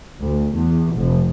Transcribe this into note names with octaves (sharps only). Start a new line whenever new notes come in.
D2
E2
F1